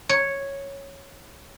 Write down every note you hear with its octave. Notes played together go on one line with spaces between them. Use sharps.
C#5